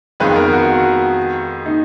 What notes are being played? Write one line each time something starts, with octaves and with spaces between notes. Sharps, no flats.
F2 D#3 G#3 B3 F4 B4
A#4
F#4
D#4